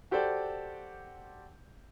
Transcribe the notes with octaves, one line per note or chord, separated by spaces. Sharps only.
F#4 G4 A4 C5 D5 G5